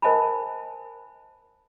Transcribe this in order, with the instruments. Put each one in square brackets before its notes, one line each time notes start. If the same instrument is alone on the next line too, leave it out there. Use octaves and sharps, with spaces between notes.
[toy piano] A#4 C5 D#5 G#5 A5 B5